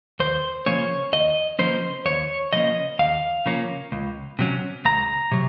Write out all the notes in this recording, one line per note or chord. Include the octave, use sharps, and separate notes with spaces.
D#2 C5
C#3 F3 A#3 C#4 C#5
D#2 D#5
C#3 F3 A#3 C#4 C5
D#2 C#5
C#3 F3 A#3 C#4 D#5
D#2 F5
C#3 F3 A#3 C#4
C#2
C3 F#3 C#4
C#2 A#5
C3 F#3